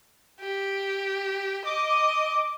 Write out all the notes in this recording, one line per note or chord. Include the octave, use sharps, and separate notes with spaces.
G4
D#5 D6